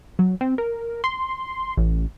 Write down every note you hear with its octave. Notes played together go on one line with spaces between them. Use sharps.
F#3
C4
A#4
C6
A1